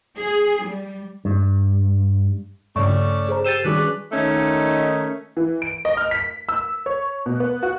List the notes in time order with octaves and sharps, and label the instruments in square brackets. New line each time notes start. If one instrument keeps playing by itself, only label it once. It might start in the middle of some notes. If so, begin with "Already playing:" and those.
[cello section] G#4
G3
[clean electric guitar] G2
[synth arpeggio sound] G2 C#3 [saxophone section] A3 C#4 D5 [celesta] C#6
[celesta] G#4 C5 A#5
[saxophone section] G4 A4 C5 [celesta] A6 D#7 E7
[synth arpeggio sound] D#3 G3 [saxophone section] C#4 D4 B4 [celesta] F#4 G#4
[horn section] D#3 A3 C#4 D#4
[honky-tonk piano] E3
D7
D#5
F6
B6
E6
C#5
B2
B3
F#4